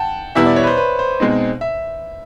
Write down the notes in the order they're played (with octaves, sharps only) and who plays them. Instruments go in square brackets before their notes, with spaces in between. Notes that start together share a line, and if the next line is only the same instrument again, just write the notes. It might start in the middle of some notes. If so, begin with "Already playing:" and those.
Already playing: [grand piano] F#5 G5 A5
[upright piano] E2 B2 G3 B3 E4 [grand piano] E5
[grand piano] D5
C#5
B4
C5
B4
C5
[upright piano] B2 G#3 C4 D#4
[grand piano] E5